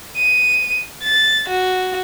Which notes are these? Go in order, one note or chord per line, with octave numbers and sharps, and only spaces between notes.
D#7
A6
F#4